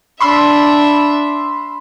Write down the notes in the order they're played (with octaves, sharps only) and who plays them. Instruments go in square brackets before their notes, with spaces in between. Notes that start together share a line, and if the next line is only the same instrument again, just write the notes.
[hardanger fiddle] D4 E5 [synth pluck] B5 C6 E6